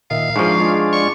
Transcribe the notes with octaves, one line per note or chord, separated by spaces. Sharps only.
A#2 D#3 E5 F5
G#2 F3 D4 C#6
G#3 D4 F4
D5 C#6